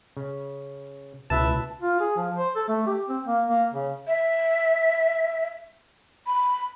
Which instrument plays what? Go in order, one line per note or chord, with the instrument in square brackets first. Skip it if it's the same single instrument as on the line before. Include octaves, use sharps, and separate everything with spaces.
[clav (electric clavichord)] C#3
[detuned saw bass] C#2 [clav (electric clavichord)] B2 [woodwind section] E4 B4 E5 [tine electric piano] A5
[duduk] F4
G#4
F3
C5
A4
A3
G4
C4
A#3
A#3
C#3
[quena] E5
B5